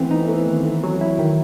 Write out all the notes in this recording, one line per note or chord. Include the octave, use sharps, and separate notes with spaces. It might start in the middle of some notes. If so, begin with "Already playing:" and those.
Already playing: E3 A3 B3 C4
D#4
A3
D#3
A3
F#3
E4
D#3